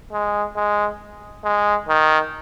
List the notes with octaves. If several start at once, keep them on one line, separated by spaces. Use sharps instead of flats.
G#3
G#3
G#3
D#3